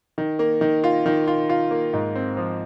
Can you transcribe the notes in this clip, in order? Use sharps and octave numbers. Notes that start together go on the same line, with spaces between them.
D#3
A#3
D#3
F4
D#3
F4
F4
A#3
G#2
C4
F3